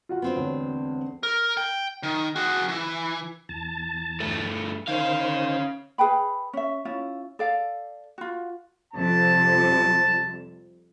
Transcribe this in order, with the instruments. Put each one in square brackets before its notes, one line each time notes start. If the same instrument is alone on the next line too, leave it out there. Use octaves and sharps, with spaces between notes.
[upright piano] F4 F#4 F#5
[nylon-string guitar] B3 C4 D4
[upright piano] E1 D2 C#5
[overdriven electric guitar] A#4
G5
D#3
F#4 G#4
E3
[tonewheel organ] E2 A5
[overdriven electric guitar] G2 A3
[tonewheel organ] D#3 C5 [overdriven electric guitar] C#4 F5
[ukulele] G#4 B4 G5 B5
C#4 E5
C#4 E4 F4
A4 D5 F5
F4 F#4
[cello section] F2 C3 G3 [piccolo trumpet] A5